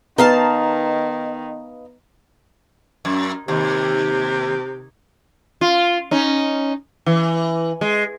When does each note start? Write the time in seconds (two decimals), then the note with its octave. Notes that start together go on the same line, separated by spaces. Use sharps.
0.18 D#3 B3 D#4 F5 A5
3.05 F#2
3.48 D#2 C3
5.61 F4
6.11 C#4 D#4
7.06 E3
7.81 G#3